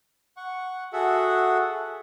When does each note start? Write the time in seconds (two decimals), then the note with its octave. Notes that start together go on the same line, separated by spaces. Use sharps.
0.37 F#5 C#6
0.93 F#4 G#4 A4 E5 F#5